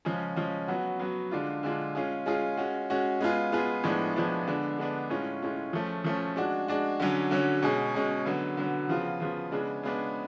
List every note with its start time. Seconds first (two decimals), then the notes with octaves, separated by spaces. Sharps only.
0.05 C#3 F3 G#3 C#4
0.36 C#3 F3 G#3 C#4
0.68 F#3 B3 F#4
0.99 F#3 B3 F#4
1.31 D3 G#3 D4 F4
1.63 D3 G#3 D4 F4
1.95 G#3 C#4 F4 G#4
2.26 G#3 C#4 F4 G#4
2.57 G#3 C#4 F#4
2.90 G#3 C#4 F#4
3.21 G#3 B3 F4 G#4
3.52 G#3 B3 F4 G#4
3.84 A2 F3 G#3 B3 D4
4.16 A2 F3 G#3 B3 D4
4.47 D3 G#3 B3 D4
4.79 D3 G#3 B3 D4
5.10 A2 G#3 C#4 F4
5.42 A2 G#3 C#4 F4
5.73 F3 A3 C#4
6.04 F3 A3 C#4
6.36 G#3 D4 F#4
6.68 G#3 D4 F#4
7.00 D3 F#3 C#4
7.31 D3 F#3 C#4
7.63 B2 G#3 C#4 G#4
7.94 B2 G#3 C#4 G#4
8.26 D3 F#3 B3
8.57 D3 F#3 B3
8.89 C#3 F3 B3 F4
9.20 C#3 F3 B3 F4
9.52 C#3 G#3 B3 D4
9.83 C#3 G#3 B3 D4